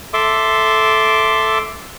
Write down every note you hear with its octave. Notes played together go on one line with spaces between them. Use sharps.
A4 E5 C6 D6